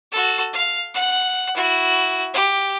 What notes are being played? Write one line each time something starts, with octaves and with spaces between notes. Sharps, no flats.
F#4 A4
F5
F#5
E4 F#4
G4